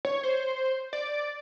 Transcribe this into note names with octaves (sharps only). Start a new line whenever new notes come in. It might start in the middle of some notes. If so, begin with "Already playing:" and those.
C#5
C5
D5